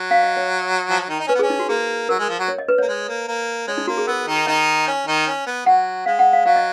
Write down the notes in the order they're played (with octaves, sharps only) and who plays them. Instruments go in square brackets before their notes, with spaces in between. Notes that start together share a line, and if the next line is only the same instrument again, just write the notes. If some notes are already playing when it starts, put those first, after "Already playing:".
Already playing: [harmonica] F#3
[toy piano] F5
D#5
C#5
[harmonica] F3
F#3
D#3 D#4
D#4
[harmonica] C#4 [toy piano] B4
[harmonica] B3
[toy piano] G#4
[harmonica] C#4
[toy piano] D#4
F#4
[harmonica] A#3 [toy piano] G#4
[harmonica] F#3 [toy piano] A#4
[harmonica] G#3
F3
F#3
[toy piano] C#5
D#5
B4
[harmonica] A#3 [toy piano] C#5
[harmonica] G#3
A#3
A#3
[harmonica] G#3 [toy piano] C#5
[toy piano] D#4
[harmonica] A#3 [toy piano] F#4
[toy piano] G#4
[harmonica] B3 [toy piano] A#4
[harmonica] D#3 D#4
[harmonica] D#3 D#4 [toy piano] D#5
[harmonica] C#4
D#3 D#4
C#4
B3
[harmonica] F#3 [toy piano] F#5
[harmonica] G#3 [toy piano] F5
[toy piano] F#5
F5
[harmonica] F#3 [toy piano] F5
[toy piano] D#5